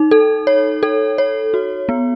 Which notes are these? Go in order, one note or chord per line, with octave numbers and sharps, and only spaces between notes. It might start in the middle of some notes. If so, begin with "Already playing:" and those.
Already playing: D#4
A4
C#5
A4
C#5
F#4
B3